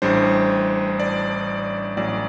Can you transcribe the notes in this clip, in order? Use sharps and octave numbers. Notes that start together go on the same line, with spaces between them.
A1 A2 G3 D4 C5
D5
A1 A2 F#3 D5